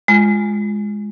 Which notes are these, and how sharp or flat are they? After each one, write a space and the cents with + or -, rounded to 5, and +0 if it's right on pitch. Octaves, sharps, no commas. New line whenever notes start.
G#3 +0 F4 +0